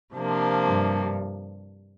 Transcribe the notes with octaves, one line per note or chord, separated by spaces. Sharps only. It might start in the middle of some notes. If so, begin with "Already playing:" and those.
C3 F3 A#3 D4
G2